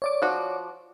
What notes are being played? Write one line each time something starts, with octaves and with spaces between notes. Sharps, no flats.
C#5 D5 D6
F3 F#4